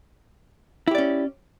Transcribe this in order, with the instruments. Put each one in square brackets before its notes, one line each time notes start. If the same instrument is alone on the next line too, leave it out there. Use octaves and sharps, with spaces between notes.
[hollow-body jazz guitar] E4
G4
D5
C#4